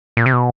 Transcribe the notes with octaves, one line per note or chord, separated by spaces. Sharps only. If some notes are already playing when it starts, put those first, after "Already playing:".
A#2
C3
B2